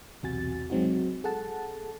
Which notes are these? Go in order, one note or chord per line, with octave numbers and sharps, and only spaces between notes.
B1 E2 C3 F#4 G#5 A6
F#3 G#3 C4 D#4 F#4
G#4 A4 F#5 A5